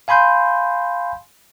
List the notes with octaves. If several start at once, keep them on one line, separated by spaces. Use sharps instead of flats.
F5 G#5 B5 C6 G6